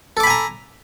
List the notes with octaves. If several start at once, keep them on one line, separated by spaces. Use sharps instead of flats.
A4 G#5 A#5 B5 D6